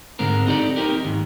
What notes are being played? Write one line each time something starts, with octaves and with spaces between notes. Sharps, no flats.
G#2 D3 G#3 C4 A#4
C4 D#4 G4 A4 D5
C4 D#4 G4 A#4
D#2 G#2